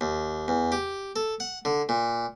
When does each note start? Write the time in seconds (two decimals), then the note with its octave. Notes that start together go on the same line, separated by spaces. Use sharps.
0.01 D#2
0.48 E2
0.72 G4
1.16 A4
1.40 F#5
1.65 D3
1.89 A#2